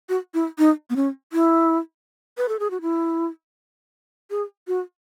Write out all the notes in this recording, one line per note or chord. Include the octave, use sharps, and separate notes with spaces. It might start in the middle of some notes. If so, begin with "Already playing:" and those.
F#4
E4
D#4
B3
C#4
E4
B4
A4
G#4
F#4
E4
G#4
F#4